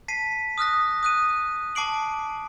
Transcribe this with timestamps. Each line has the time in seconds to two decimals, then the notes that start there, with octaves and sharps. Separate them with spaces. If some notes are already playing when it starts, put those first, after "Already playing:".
0.08 A5 B6 C7 D#7
0.58 D#6 F6 F#6 A#6
1.03 D#6 F#6 D#7
1.75 A5 D6 C7 D7 F#7